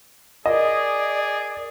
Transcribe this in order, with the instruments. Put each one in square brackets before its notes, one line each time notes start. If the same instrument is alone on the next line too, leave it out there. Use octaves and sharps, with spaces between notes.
[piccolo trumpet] G#4 [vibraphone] A#4 [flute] D5 [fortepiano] D#5